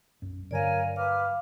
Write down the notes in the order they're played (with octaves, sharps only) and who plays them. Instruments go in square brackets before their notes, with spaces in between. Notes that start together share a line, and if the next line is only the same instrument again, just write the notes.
[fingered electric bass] B1 F#2
[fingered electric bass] G2 D3 F#3 [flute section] A#4 C#5 G#5 [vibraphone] D5 F5
[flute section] B4 D6 F6 [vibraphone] F5